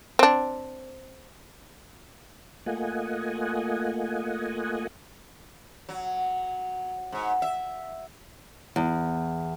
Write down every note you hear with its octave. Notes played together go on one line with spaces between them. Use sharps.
C4 D4
A3 A#3 F4 D#5 F#5 G#5
F#3
G#2
E5
E2